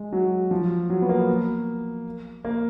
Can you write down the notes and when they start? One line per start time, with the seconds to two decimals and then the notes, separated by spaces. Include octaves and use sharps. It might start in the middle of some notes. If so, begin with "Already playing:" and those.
Already playing: G#3
0.13 F#3
0.51 F3
0.90 F#3
1.02 B3
1.09 A#3
2.45 A#3